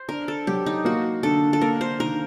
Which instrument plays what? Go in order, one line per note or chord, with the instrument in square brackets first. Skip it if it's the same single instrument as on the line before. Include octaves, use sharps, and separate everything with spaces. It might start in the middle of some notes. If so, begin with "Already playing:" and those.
Already playing: [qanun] C5
[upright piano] D4 [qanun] A#4
[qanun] A4
[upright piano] F#3 [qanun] G4
[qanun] D#4
[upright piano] A#3 [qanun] F#4
[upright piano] D3 [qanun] A4
[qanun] A4
[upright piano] A#3 [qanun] A#4
[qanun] C5
[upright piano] D#3 [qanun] A#4